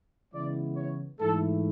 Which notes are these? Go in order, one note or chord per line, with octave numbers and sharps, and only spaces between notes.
C#3 E3 G#3 B3 E4 D5
C#5
G#2 E3 A3 E4 A4